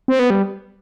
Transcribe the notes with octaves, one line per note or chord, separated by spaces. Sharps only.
C4
B3
G3